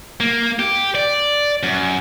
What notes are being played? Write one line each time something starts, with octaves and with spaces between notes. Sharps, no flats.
A#3
G4
D5
F#2